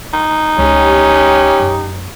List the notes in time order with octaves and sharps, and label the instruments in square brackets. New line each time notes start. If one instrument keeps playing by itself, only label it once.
[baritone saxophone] D#4
[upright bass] C#2 D3 [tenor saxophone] C#4 [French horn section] G4
[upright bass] F#2